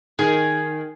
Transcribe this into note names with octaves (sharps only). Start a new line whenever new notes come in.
D#3 G#4